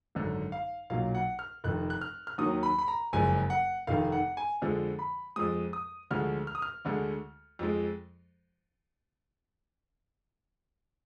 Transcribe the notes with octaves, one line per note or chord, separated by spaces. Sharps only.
G#1 F#2 D3
F5
B1 A#2 F#3 F5
F#5
F6
F1 F2 D#3 F#6
F#6
F6
F6
D#2 D#3 F#3 D#6
B5
B5
A#5
F#1 F2 F3 G#3 G#5
F#5
F1 F2 D#3 F5
F#5
G#5
F2 D3 F3 G#3
B5
F2 F3 G#3 D#6
D#6
D2 D3 F3 G#3 F6
F6
D#6
F6
D2 D3 G#3
F2 F3 G#3